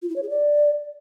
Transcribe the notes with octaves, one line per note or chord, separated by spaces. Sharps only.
F4
E4
C#5
G#4
D5